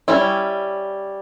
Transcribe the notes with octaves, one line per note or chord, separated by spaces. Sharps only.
G3 C#4 E4